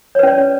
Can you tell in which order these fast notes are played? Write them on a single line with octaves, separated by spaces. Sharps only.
C#5 B4 C#4 D5